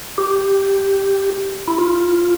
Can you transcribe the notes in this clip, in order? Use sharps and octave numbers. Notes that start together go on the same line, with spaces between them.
G4
E4
F4